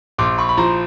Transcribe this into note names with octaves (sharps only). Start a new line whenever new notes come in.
A#1 C6 D6
B5 C#6
B5
F3 A#5 C6